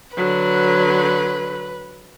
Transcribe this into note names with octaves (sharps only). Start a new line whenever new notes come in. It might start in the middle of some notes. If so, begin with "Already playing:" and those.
D3 F#3 B4